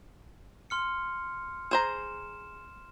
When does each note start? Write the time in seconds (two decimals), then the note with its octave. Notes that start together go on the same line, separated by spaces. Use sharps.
0.70 C6 F6 C#7
1.71 G#4 C5 A#5 E7